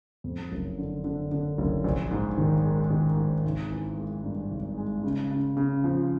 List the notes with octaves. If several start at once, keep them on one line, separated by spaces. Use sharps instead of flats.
F2
F#1
D3
D3
D3
F#1
A#1
G#2
D#3
G#3
D#3
G#2
G#1
E3
G#3
G2
G#1
G#3
C#3
C#3
C#3
F3